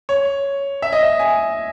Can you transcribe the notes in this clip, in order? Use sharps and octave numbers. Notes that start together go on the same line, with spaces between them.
C#5
E5
D#5
E5
G#5